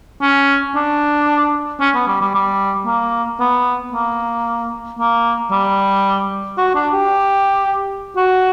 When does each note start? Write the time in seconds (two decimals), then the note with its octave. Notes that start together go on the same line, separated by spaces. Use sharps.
0.22 C#4
0.76 D4
1.81 C#4
1.95 B3
2.07 G3
2.21 G3
2.35 G3
2.86 A#3
3.40 B3
3.93 A#3
4.99 A#3
5.52 G3
6.58 F#4
6.75 D4
6.94 G4
8.16 F#4